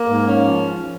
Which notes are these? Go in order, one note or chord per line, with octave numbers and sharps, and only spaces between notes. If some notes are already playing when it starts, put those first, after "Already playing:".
Already playing: A#3
G#2
C#4
F3